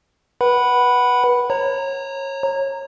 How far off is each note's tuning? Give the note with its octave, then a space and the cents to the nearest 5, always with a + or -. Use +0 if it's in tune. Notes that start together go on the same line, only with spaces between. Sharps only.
B4 -20 F#5 +15 B5 +0
C#5 -25 A#5 -10